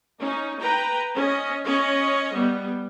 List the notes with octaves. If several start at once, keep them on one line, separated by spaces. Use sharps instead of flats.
C#4 D#4
B4 G5 A#5
C#4 D#5
C#4 C#5 D#5
G3 B3